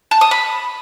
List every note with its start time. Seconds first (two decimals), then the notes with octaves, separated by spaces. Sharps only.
0.11 A5
0.21 D#6
0.31 B5